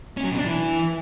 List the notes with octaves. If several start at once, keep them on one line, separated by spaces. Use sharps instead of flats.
C#4
F#3
B2
D4
E3